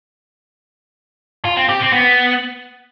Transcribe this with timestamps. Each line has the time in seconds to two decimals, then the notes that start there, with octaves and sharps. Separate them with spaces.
1.45 F4
1.57 C4
1.69 G4
1.81 C4
1.93 B3